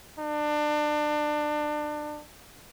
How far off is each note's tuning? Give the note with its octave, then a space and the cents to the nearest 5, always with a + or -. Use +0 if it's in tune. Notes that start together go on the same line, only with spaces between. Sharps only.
D4 +30